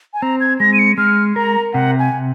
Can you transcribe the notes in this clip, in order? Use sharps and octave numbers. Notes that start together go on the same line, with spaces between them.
G#5
C4 A#5
G#6
G#3 A#6
D#7
C#7
G#3 F6
A#4 A#5
C3 F#5
G#5